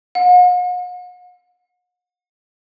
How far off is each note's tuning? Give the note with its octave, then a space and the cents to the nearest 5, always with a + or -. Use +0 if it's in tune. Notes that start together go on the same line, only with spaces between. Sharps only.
F#5 -45